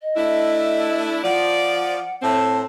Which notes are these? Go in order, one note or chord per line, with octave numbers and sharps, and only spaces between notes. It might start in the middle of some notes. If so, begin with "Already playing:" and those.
D#5
A3 D4 E4
F3 D5 F#5
A2 C4 A5